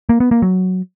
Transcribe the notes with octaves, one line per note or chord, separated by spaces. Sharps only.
A#3
B3
A#3
F#3